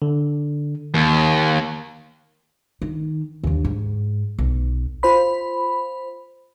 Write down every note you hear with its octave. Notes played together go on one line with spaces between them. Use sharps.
D3
D#2 D#3
D#3
D#2 D3
G#2
B1
F4 C5 B5